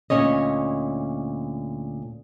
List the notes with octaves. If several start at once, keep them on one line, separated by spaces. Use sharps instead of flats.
D2 A#2 C#4 C#5 D#5